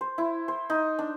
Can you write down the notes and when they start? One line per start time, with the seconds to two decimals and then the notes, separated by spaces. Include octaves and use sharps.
0.01 C5
0.18 E4
0.48 C5
0.70 D#4
0.99 D4